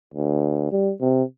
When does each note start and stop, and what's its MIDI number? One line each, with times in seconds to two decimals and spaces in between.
0.14 0.68 38
0.72 0.93 55
1.01 1.23 48